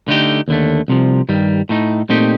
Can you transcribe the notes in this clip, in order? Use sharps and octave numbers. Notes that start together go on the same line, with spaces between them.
D3 A3 D#4 G4
D#2 D3 A3
C2 C3 F3
G2 D#3 G3
A2 A3 D#4
A#2 A3 C4 D#4 G4